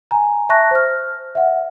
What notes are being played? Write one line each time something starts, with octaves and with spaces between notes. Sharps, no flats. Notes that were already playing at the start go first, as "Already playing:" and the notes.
G#5 A#5
E5 A5 C#6 F#6 A#6
C5 F6
E5 F#5